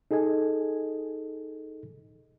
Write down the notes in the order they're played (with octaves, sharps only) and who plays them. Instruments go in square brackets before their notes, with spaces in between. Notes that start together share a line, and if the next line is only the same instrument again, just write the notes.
[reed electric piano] D#4 G#4 A4 D#5 G#5